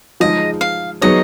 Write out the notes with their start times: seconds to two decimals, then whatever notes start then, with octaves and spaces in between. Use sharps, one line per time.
0.20 F3 G#3 D#4 G#4 D#5
0.61 F5
1.02 F#3 B3 D#4 G#4 C#5 D#5